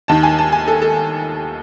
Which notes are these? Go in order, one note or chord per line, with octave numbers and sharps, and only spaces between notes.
D#2 D#3 A5
G#5
A5
G#5
A4
A4